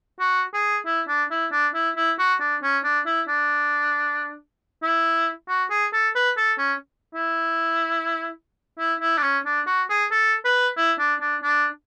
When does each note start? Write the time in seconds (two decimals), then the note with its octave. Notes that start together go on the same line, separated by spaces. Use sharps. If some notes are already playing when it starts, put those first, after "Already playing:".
0.20 F#4
0.54 G#4
0.86 E4
1.08 D4
1.31 E4
1.52 D4
1.75 E4
1.96 E4
2.19 F#4
2.40 D4
2.63 C#4
2.84 D4
3.06 E4
3.28 D4
4.83 E4
5.48 F#4
5.70 G#4
5.93 A4
6.15 B4
6.37 A4
6.58 C#4
7.14 E4
8.79 E4
9.01 E4
9.18 D4
9.23 C#4
9.45 D4
9.67 F#4
9.90 G#4
10.11 A4
10.45 B4
10.77 E4
10.99 D4
11.21 D4
11.43 D4